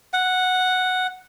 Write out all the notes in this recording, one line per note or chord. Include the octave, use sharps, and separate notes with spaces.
F#5